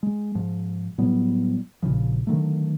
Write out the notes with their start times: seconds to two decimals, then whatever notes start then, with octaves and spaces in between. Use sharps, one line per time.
0.03 G#3
0.35 G#2 F3
0.98 A2 F#3 G3 B3
1.82 A#1 A#2 C#3 F3
2.27 D3 D#3 F#3 A3